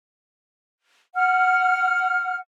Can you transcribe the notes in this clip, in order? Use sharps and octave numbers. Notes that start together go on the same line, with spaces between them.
F#5 F6